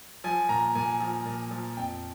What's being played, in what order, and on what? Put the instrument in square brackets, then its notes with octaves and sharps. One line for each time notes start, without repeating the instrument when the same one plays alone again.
[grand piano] F3 G#5
A#2 A#5
A#2 G#5
F3
A#2
F3
F2 G5